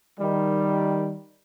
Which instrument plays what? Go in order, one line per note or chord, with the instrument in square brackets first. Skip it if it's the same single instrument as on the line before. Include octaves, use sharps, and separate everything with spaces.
[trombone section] D#3 G3